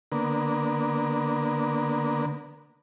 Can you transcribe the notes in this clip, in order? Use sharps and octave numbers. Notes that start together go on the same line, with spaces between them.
D3 A#3 B3